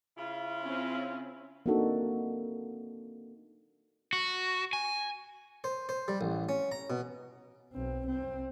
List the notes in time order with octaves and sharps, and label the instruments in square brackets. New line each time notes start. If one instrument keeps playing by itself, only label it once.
[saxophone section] C#3 E4 F4
[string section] C4 C#4
[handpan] A#3 C4 D4 D#4 F#4 A4
[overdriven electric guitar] F#4
G#5
[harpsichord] C5
C5
G3
A1
C#4
A#5
B2
[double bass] B1 C4
C2 C4